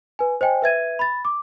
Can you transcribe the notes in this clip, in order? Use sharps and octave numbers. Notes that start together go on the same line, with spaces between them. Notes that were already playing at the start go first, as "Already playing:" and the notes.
B4 G#5
C5 D#5 G5 G#5
B4 E5 G#6 D#7
B5 A6
D6